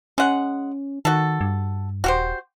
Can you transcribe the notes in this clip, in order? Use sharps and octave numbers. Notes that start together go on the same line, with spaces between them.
G#3 C#4 F#5
D#3 F#4 A4
G2
D#1 F#4 G4 C5